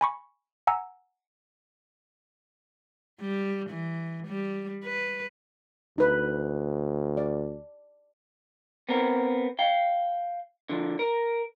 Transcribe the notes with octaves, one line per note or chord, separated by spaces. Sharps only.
G#5 B5 C#6
F#5 G#5 A#5 E6
G3
E3
G3
B4
D2 D#4 B4
D5
B3 C4 A#4
F5 G5
D3 F3
A#4